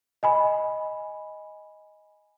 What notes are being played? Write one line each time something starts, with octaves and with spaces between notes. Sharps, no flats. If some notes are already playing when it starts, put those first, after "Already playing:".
D#5 G#5 B5